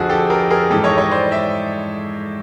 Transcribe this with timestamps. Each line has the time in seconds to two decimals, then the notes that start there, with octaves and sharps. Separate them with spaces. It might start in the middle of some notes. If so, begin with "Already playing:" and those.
Already playing: F2 D3 F3 F#4 G#4
0.10 G4 A4
0.30 G#4 A#4
0.50 G#4 A#4
0.70 G#2 E3 G3 G4 A4
0.84 C#5 D#5
0.98 C#5 D#5
1.11 C5 D5
1.31 D5 E5